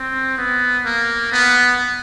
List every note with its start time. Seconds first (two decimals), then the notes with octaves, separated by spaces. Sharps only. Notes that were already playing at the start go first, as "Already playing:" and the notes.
Already playing: C4
0.38 B3
0.85 A#3
1.32 B3